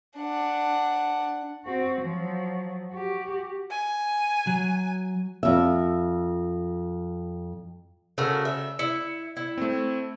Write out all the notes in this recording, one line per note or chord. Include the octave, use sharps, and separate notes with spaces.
D4 F#5
C4 F#4
F3 F#3
F#4 G4
G#5
F#3
F2 E5
C#3 A3 F#4 A#4
E5
E4 C#7
E4
A3 C4